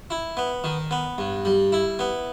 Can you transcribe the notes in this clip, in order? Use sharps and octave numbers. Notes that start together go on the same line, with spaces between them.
E4
B3
D#3
B3
G2
G3
E4
B3